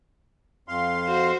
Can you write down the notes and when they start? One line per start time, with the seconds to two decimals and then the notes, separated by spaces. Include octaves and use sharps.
0.68 F2 F5 C6
1.07 F#4 C5